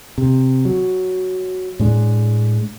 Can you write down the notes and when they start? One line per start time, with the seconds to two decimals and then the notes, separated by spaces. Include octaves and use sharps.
0.18 C3
0.65 F#3
1.80 A2 G#3 D4